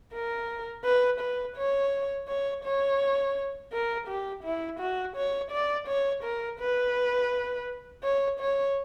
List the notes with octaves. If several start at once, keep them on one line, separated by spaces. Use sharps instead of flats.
A#4
B4
B4
C#5
C#5
C#5
A#4
G4
E4
F#4
C#5
D5
C#5
A#4
B4
C#5
C#5